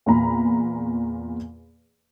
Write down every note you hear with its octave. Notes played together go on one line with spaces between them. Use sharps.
E2 A#2 A#5 B5